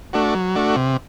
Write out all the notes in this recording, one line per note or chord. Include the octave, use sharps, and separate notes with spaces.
A3 D4 F#4
F#3
A3 D4 F#4
C3